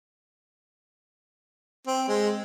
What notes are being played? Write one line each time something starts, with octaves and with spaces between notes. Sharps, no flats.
C4
G#3